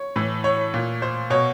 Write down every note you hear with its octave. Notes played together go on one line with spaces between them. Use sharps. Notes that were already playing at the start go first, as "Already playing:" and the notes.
Already playing: C#5
A2 E3
C#5
A#2
C5
B2 C#5